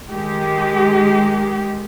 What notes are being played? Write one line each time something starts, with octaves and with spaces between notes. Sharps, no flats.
D#3 G#3 G4